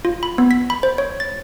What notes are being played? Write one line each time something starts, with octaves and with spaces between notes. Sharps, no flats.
F4
B5
B3
B6
B5
C5
C#5
A6